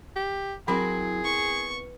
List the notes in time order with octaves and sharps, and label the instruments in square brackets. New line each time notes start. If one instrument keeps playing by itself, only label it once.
[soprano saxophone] G4
[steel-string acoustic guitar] F#3 E4 [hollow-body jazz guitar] C4 A#4 B5 [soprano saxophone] G#4
[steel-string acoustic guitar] B3 [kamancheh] C#6